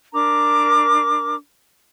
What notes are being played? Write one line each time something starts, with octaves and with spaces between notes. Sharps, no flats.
D4 A#4 A#5 D6